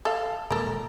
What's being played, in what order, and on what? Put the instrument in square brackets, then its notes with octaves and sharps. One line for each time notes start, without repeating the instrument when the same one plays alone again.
[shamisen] A4 F5
[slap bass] D#1 A#2 G#3 [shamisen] A4 A#4